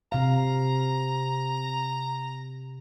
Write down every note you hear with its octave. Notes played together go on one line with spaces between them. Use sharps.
C3 F5 A#5